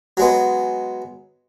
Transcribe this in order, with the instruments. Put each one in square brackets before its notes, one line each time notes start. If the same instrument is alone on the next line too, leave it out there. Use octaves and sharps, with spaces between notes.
[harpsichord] F#3 G#3 B3